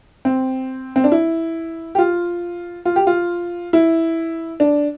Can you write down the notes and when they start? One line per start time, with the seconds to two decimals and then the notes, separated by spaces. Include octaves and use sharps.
0.25 C4
0.96 C4
1.04 D4
1.12 E4
1.95 G4
1.98 F4
2.85 F4
2.96 G4
3.07 F4
3.73 E4
4.60 D4